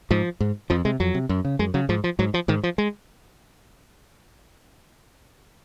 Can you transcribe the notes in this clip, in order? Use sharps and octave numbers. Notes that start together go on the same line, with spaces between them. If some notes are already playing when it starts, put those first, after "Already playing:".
G#2 F3
G#2
F2 F3
C3 G#3
F2 F#3
C3
F#2
C#3
F#2 G#3
C#3 F#3
G#2 F3
F3
G#2 F#3
F3
G#2 D#3
F3
G#3